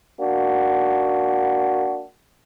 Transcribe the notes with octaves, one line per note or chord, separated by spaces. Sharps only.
A#3 D4 F#4